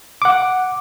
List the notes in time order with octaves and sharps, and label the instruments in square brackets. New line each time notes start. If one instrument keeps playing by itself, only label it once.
[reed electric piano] F#5 D6